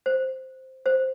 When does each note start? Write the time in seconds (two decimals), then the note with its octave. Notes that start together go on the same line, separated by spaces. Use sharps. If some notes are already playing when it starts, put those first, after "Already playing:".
0.06 C5
0.86 C5